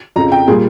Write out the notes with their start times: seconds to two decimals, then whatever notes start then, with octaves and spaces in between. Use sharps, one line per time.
0.16 F2 C#3 F3 A#5
0.32 G5
0.48 A#2 G3 G#4